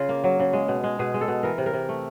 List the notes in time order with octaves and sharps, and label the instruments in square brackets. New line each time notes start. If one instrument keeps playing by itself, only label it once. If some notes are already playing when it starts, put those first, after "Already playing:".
Already playing: [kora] C#3 F4
A#3
F#3
C#3
G#3
B2
G#3
B2 G#4
G#3
A4
B2
E3 A#4
C3
A#4
C3
A3